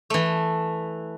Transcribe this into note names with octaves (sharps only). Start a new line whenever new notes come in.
E3 A3